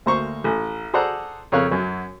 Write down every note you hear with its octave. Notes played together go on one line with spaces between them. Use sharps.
D2 A#3 C5 A#5 C#6
A1
G#4 A4 C5 D5 F#5 A#5
F2 C#3 A#4 C#5 F5 F#6
F#2 F#3